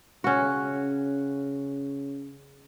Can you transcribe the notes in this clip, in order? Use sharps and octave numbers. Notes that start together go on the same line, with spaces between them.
C#3 C#4 F#4